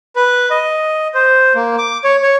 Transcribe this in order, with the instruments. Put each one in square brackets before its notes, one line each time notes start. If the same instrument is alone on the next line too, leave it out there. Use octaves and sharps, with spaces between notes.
[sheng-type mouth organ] B4
D#5
C5
A#3
D6
C#5
C#5